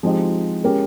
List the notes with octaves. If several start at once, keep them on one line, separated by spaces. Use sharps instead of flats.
F3 G#3 C4 D#4 G4
G#3 C#4 G4 A#4